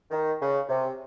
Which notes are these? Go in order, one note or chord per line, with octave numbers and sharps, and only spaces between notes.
D#3
C#3
C3